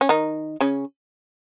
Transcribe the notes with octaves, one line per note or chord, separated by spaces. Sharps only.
C#4
D#3 D#4
C#3 C#4